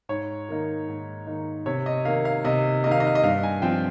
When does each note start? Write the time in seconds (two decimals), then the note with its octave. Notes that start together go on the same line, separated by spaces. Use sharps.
0.09 G#2 C#5
0.49 D#3 A#3 D#4
0.88 G#2
1.27 D#3 A#3 D#4
1.66 C3 C#5
1.86 D#5
2.05 D#3 A#3 F5
2.25 F5
2.44 C3 D#5
2.84 D#3 A#3 D#5
2.91 F5
3.00 D#5
3.07 F5
3.15 D#5
3.23 G2 F5
3.43 G#5
3.62 F3 C4 F4 G5